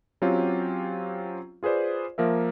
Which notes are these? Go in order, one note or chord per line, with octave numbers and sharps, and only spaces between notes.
F#3 C4 C#4 F4 G4
F4 G#4 B4 C5 D5
F3 A#3 A#4 E5